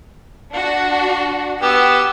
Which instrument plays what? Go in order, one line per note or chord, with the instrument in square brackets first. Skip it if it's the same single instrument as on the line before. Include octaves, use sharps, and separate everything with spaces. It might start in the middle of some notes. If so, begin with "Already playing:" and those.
[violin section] D4 F#4
[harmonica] B3 G4 [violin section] E6